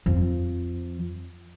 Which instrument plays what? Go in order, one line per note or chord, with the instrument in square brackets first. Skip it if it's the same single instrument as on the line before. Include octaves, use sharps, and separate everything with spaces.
[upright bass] F2 F3